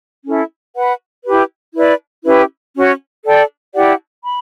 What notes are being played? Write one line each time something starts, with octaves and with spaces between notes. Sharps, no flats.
C#4 E4 A4 E5
B4 F#5 B5
E4 G4 B4
E4 B4 D5
C#4 E4 G4 B4
C#4 F#4 C#5
A4 D5 G5
E4 G4 D5 F#5
B5